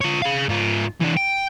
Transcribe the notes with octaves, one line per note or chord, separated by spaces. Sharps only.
F4 C#5
G#4 F5
G#2 F4
E3 D4
G5